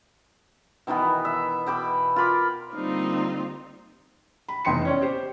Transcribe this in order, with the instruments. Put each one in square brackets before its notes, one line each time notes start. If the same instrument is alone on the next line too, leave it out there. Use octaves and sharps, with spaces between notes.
[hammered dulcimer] B2 D#3 E3 B3
E5
B2 G5 B5 D6
F4 A#4 B5 D6
[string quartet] D3 G3 A#3 C4 D#4 F4
[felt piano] B5
F1 E2 G5 C6 C#7
C#4 C#5 D5
G4 C5